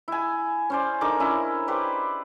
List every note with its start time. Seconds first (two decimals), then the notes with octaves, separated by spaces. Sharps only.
0.08 E4 G#5
0.70 C#4 C5 D5
1.01 D3 D#4 A#4 D6
1.20 C#4 E4
1.68 G4 B4 C5 D5